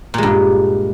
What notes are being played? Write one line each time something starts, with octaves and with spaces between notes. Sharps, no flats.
G2 A#2 G#3